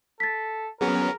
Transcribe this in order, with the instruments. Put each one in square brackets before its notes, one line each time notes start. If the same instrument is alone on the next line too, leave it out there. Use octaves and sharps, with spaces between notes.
[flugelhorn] A4 [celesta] A6 B6
[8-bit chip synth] F#3 B3 C#4 [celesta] G#4 [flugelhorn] A#4